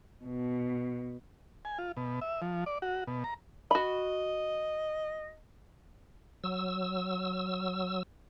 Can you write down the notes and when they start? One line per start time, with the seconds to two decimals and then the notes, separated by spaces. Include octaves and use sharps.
0.24 B2
1.65 G#5
1.78 F4
1.97 B2
2.21 E5
2.42 F3
2.66 D5
2.82 F#4
3.07 B2
3.24 A#5
3.71 F#4 D#5 B5
6.44 F#3 E6